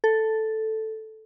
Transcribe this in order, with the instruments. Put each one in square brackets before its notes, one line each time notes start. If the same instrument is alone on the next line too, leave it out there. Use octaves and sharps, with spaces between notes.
[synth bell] A4